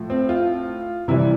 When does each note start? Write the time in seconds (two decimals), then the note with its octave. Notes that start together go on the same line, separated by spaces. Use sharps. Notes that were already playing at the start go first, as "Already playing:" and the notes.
Already playing: A2 F3
0.10 C4
0.29 F4
1.08 C3 E3 G3 E4